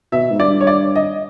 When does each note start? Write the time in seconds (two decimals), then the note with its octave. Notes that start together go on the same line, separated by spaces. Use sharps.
0.12 B2 E5
0.31 G#2
0.40 G2 D5
0.61 C#5
0.67 D5
0.95 D#5